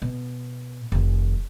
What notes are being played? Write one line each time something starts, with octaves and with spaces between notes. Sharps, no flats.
B2
F1 D#3